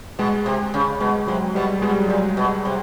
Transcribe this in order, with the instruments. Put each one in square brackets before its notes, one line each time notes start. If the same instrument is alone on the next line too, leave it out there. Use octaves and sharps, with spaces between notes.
[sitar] B2 [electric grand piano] G#3
[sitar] C3
C#3
[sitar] B2 [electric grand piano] G#3
[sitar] C3 [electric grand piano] F#3
[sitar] B2 [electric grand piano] G3
[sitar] B2 [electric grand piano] G#3
[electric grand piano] G3
F#3
[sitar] A#2 [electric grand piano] G3
[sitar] B2
C3